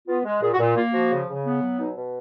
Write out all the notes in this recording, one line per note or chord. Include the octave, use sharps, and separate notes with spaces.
B3 F4
G#3
A#2 G#4
F#4
A#2
A#3 F4
F3 F#4
C#3
C#3
B3
F#3
B2 D#4
B2